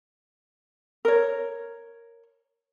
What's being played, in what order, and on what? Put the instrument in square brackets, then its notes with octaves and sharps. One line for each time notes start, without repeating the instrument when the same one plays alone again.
[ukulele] A#4 C#5